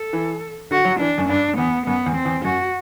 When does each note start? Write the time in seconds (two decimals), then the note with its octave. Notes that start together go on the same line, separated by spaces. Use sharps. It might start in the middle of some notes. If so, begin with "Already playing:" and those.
Already playing: A4
0.13 E3
0.71 D3 F#4
0.85 F#3
1.00 E3 D4
1.18 F#2
1.29 G2 D4
1.57 E2 B3
1.86 F#2 B3
2.06 E2
2.16 C4
2.25 E2
2.44 F#2 F#4